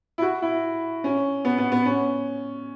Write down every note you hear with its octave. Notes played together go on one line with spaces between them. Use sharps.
E4
F#4
E4
C#4
B3
B3
B3
C#4